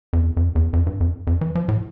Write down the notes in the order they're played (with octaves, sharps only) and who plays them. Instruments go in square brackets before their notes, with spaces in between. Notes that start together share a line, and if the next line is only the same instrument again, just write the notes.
[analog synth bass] F2
E2
F2
E2
F2
G2
F2
F2
E3
F3
A2